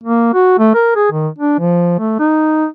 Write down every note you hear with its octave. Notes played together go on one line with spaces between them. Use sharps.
A#3
F#4
A3
A#4
G#4
D#3
D4
F3
A3
D#4